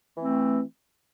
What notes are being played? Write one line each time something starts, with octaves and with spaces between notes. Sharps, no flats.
E3 A3 C4